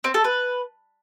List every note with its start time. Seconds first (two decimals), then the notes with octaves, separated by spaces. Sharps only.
0.04 C4
0.14 A4
0.24 B4